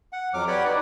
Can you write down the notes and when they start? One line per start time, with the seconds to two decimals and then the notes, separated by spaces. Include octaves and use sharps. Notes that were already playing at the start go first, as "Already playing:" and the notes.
0.13 F#5
0.34 F2 F#3 D6 F6
0.48 G4 B4 C#5 D5 F#5 G5
0.65 D#4 B4 D5